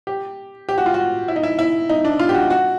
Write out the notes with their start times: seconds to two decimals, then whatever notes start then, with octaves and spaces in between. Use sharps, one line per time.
0.07 G4
0.69 G4
0.78 F#4
0.86 F4
0.94 F#4
1.28 E4
1.36 D#4
1.43 E4
1.59 E4
1.89 D#4
2.05 D4
2.19 F4
2.29 G4
2.34 F#4
2.50 F#4